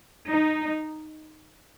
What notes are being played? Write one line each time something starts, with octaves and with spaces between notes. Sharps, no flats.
D#4